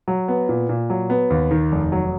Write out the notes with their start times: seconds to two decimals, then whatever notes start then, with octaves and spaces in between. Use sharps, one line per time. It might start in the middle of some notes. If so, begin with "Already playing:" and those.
0.08 F#3
0.28 B3
0.49 A#2
0.69 A#2
0.90 F#3
1.10 B3
1.30 D#2
1.51 D#3
1.72 F1
1.92 F#3